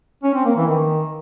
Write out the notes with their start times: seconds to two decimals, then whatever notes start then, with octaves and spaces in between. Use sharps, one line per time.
0.24 C#4
0.34 C4
0.45 A#3
0.56 E3
0.67 D#3